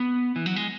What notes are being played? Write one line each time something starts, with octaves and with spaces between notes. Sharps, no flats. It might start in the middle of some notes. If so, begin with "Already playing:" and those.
Already playing: B3
E3
F#3
G#3